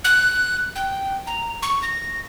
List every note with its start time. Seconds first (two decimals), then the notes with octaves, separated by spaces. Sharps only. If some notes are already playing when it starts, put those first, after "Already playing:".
0.05 F#6
0.75 G5
1.27 A#5
1.62 C#6
1.83 A#6